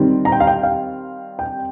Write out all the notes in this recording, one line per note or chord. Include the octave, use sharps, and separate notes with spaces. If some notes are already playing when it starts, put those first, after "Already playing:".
Already playing: D#3 G3 C4
A#5
G5
F5
G5
F5
G5